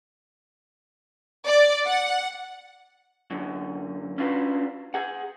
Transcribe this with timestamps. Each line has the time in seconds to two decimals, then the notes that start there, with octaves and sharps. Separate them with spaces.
1.48 D5
1.86 F#5
3.31 F#2 D3
4.18 C#4 D4 F4 F#4 B4
4.94 G#4 F#5